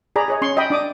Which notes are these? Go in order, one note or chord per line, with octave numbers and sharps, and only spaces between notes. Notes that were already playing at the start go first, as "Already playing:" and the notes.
G#4 D5 A#5 B5
G#4 C#5 D#5
C#4 C6 C#6
D#5 E5 G5 B5
D4 D6 D#6